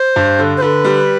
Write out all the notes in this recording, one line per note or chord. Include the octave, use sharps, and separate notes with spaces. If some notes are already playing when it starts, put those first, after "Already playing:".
Already playing: C5
G2
D3
C5
D3 B4
G3